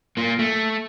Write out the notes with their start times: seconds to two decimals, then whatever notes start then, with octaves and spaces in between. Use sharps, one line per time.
0.17 A#3 F4
0.39 A3